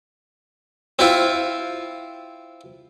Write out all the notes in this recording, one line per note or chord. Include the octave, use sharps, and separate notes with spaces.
C4 E4 F4